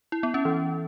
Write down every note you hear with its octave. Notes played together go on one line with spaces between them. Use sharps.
E4
B3
C#4
E3